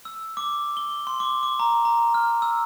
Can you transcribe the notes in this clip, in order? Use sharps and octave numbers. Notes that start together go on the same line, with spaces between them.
E6
D6
G7
C6
D6
D6
A#5
A#5
F6
E6